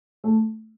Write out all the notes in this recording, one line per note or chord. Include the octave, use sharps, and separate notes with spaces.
A3